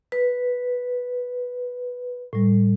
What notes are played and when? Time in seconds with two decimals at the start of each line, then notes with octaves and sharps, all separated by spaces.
0.12 B4
2.33 A2 G3